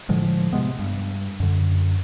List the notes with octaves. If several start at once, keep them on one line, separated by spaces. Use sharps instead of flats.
A2 D3 F3 G#3
C3 G#3 B3
G2
F#2 D3